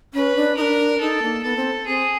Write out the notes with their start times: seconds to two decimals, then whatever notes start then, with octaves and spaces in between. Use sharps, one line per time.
0.14 C#4 B4
0.36 D4
0.57 D#4 A#4
0.61 D4
1.00 D#4 A4
1.22 A#3
1.43 B3 A4
1.57 C4
1.86 C4 G#4